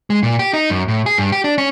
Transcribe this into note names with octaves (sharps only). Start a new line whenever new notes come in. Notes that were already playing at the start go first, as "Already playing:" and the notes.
G#3
A#2
G4
D#4
F#2
A2
G#4
G2
G4
D4
C#4